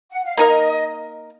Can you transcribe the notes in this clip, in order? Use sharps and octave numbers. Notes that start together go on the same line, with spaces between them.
F#5
F5
A#3 D#4 A#4 D#5